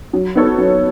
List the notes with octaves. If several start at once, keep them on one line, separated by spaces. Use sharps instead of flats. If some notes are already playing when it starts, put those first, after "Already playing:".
F#3
B3 D#4 A4 C#5
F#3